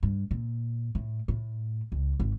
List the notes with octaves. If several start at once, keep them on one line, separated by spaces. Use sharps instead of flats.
G2
A#2
A2
A2
C#2
G#1